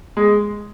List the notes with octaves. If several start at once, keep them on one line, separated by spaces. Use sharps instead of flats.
G#3